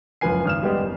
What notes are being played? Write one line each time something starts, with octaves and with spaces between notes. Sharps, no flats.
F#1 C#2 F3 B4 G#5 C7
G#1 F6 E7
G3 G#3 B3 G4 D5
F#1